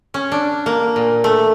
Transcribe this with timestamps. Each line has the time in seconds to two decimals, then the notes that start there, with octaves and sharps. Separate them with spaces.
0.14 C#4
0.32 D4
0.66 A#3
0.96 A#2
1.24 A3